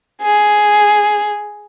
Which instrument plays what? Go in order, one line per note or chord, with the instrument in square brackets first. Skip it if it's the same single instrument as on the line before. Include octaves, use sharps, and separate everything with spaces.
[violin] G#4